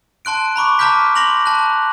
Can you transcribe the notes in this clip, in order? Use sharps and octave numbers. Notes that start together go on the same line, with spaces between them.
A5 C6 F#6 D7
A#5 B5 C#6 D6
A5 A#5 D6 F6 G6 B6
C6 D6 A#6 F7 F#7
A5 F#6